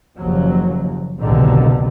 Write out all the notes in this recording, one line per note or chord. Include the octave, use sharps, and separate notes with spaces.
F#1 D#2 F3 F#3
F#1 C2 G#2 B2 D3 D#3